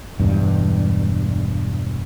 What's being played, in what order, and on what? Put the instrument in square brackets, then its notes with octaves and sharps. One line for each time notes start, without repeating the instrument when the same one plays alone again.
[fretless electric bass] E1 G2